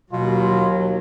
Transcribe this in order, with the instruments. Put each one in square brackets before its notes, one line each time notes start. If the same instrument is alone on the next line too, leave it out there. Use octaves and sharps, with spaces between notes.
[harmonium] D#2 [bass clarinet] B2 [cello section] F#3 [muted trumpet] F4